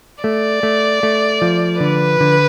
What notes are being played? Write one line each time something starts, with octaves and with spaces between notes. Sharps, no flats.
A3 D5
A3
A3
F3
D3 B4
D3